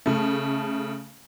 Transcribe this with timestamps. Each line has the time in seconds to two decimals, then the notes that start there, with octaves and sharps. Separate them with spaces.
0.06 C#3 A3